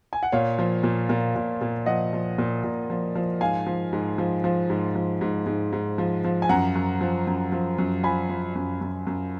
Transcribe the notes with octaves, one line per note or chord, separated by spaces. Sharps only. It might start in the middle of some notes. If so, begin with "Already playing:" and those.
G#5
F#5
A#2 C#5 F5
F3
A#2
A#2
A#2
A#2
F3 D#5 F#5
F3
A#2
A#2
F3
F3
G#2 F5 G#5
F3
G#2
F3
F3
G#2
F3
G#2
G#2
G#2
F3
F3
G#5
F#2 F#5 A#5
F#2
F3
F#2
F3
F#2
F3 G#5 B5
F3
F#2
F#2
F#2